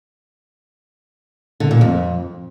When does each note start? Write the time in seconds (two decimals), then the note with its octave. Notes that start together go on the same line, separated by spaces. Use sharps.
1.60 D3
1.71 A#2
1.81 F2